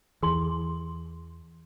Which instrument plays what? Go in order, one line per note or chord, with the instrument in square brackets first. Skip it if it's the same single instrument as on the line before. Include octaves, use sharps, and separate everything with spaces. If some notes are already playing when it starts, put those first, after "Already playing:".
[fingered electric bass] E2 E3 [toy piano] G#4 C6